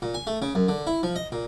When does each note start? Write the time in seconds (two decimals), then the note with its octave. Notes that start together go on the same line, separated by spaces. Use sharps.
0.02 A#2
0.14 G#5
0.27 A3
0.42 C#3
0.55 F#2
0.68 D3
0.87 E4
1.03 F3
1.16 D#5
1.32 A#2